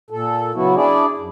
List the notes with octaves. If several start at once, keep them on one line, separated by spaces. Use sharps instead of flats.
A#2 A4
C#3 F#3 B3 E4 F#4
D4 E4 G#4 D5
F#2